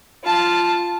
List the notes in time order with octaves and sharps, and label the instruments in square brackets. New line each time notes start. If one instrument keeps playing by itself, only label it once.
[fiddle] F4 A5